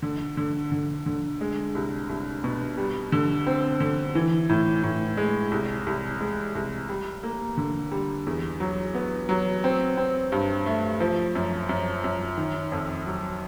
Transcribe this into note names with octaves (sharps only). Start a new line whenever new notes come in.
D3
D3
D3
D3
G#3
C2
C2
B2
G3
D3
C4
D3
E3
A2
A2
G#3
C2
C2
G#3
C2
G3
A#3
D3
G3
E2
F#3
B3
F#3
C4
C4
G2
A3
F3
F#2
F#2
F#2
D#3
F2
F#3